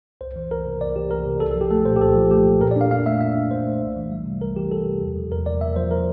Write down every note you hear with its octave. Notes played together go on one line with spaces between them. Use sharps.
C2 C5
E3
C2 A#4
C3
C2 D5
E3 G4
C2 A#4
C3
C2 A4
A4
F3 G4
A3 A4
A#2 C5
G4
C2 A4
F3
A3 G4
A#2
A#2 A#4
D5
D4 F5
A#2 F5
A3 E5
A#2 E5
D4
A#2 C5
A3
C2
E3
G3
C3
C2 A#4
E3 G4
G3 A4
C3
E2
F3
E2 A#4
C3 D5
E2 E5
F3 C5
A#4